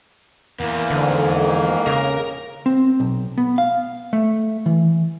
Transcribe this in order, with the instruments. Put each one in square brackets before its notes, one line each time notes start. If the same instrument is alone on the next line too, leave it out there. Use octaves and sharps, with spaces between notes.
[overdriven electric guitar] E2 E3 [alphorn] A#3
[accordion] F2 G#2 [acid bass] D3
[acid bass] C#3 [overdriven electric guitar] A#4 A#5
[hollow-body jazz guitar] C4
B1
B3
F5
A3
E3